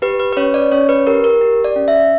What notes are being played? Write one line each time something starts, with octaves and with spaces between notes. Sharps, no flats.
G4 B4
B4
B4
C#4 C#5
D5
C#4 C#5
B4
G4 A#4
A#4
G4
D5
C#4
E5